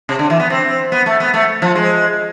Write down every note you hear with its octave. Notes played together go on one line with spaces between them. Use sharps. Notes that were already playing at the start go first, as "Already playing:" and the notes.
C3
D3
E3
B3
C4
B3
A3
B3
A3
F3
G#3